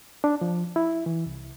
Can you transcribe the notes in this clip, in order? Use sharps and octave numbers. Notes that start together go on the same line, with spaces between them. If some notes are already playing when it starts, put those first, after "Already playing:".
D4
F3
E4
E3
C2